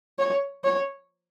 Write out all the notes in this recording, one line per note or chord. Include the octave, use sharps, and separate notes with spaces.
C#5
C#5